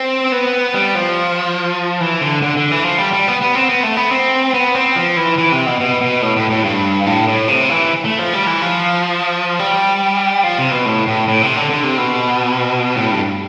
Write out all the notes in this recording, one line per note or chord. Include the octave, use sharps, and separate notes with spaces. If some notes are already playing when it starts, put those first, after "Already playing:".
Already playing: C4
B3
G3
F3
E3
D3
D3
D3
E3
F3
G3
G3
B3
B3
C4
B3
A3
B3
C4
B3
C4
F3
E3
E3
C3
B2
B2
B2
A2
A2
A2
G2
A2
A2
C3
E3
A3
F3
G3
E3
F3
G3
F3
C3
B2
A2
A2
A2
C3
D3
D3
C3
B2
A2
G2